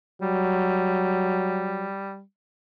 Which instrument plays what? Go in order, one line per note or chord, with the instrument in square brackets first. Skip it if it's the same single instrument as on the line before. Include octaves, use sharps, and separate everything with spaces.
[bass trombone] F#3 [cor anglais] G3